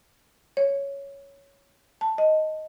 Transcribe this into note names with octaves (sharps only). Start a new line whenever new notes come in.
C#5
A5
D#5